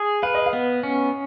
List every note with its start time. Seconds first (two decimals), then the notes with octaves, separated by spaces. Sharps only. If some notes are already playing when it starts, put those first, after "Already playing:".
Already playing: G#4
0.23 B4 F5
0.35 D#5
0.46 F5
0.53 B3
0.83 C#4